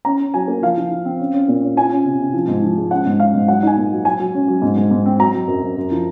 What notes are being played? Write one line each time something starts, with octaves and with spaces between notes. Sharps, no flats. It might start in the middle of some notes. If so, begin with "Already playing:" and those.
C#4 A#5
C#4
F#3 G#5
A#3
F3 F5
F3
F3
C4
C#4
C#4
A#2
C#4
F4 G#5
C#4
C3
C3
F3
G#2
F3
G#3
C#4 F#5
G#2
C#4 F5
G#2
F#3 F#5
D#4 G#5
A#2
F#3
F#3 G#5
F#3
C#4
F#3
G#2
G#2
G#2
C4
F#3 A#5
F#3
F#2
F#2
F#2
F3